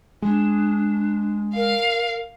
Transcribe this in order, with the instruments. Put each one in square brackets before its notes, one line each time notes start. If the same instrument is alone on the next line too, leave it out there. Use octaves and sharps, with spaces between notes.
[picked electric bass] G#3 [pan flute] D4
[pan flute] A#4 [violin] F5